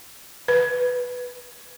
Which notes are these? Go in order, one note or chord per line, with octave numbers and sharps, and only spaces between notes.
B4